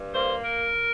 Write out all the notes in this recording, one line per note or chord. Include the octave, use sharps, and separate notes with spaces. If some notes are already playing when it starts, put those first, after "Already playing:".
Already playing: G2
A#3 C5
A#4